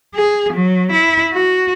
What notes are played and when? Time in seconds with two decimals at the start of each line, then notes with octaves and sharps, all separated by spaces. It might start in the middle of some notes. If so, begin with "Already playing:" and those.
0.15 G#4
0.53 F#3
0.92 E4
1.34 F#4